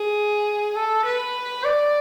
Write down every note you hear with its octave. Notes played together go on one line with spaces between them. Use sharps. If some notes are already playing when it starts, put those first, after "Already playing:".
Already playing: G#4
A4
B4
D5